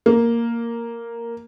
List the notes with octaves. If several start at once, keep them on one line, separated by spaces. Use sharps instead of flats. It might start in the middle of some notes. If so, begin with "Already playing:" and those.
A#3